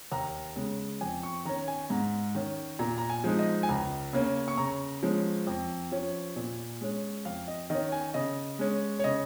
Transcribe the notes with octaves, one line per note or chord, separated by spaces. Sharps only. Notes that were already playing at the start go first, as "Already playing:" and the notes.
D#2 A#5
C#3 G#3
F2 G#5
C#6
D#3 C#4 A#5
G#5
G#2 A#5
D#3 C#4
A#2 A#5
A#5
G#5
F3 G#3 D#4
D#5
G#5
C#2 A#5
C#3 A#3 C#4
C#6
C#3 A#5
F3 G#3 C#4
F2
F3 C#4
A#2
G#3 C#4
F2 F5
D#5
D#3 C#4 D#5
G#5
C#3 D#5
G#3 C#4
C#5
C#3 D#5